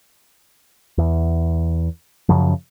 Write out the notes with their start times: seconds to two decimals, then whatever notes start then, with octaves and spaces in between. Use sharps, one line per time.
0.98 E2
2.29 F#2 C#3 F3